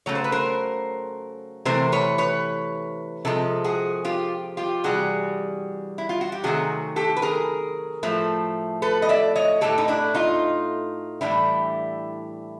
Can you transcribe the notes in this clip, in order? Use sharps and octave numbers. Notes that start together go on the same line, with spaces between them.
C#3 F#3 A3 C#5
C5
B4
A#4 C5
C3 E3 A3 A#4 C5
B4 C#5
B4 C#5
C3 F3 G#3 A4
F#4 G#4
F4 G4
F4 G4
C3 E3 G3 F#4 G#4
E4
F4
F#4
G4
C3 D#3 F#3 A3 F#4 G#4
G4 A4
B4
G#4 A#4
A2 F3 A3
A4 B4
D#5
D5 E5
C#5 D#5
A2 E3 A3 G4 A4
D#4
D4 E4
D#4 F4
A2 E3 G3 D4 E4